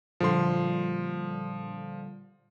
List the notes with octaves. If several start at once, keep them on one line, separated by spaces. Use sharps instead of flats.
A#2 D3 F3 G3 C6